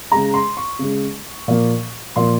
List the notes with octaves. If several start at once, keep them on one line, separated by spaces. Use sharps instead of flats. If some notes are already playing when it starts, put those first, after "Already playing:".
C#3 G#3 A#5
C6
C#6
C#3 G#3
A#2 F3 A#3
A#2 F3 A#3 C6